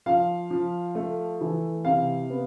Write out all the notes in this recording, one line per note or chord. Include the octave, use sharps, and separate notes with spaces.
F3 F5
F3
A3
E3
C3 F5
B3